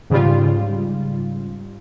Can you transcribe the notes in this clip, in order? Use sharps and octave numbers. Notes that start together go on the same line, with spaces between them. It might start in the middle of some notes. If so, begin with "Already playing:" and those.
G#2 C#3 G3 F4